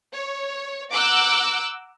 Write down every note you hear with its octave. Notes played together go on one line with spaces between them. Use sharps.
C#5
F#5 A#5 D6 E6 F#6 G6